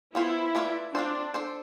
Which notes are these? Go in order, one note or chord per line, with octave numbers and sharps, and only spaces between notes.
B3 E4 F4 A4 C5
A3 D4 F4 B4 D5
C4 D4 F4 A4 C5
D4 A4 C5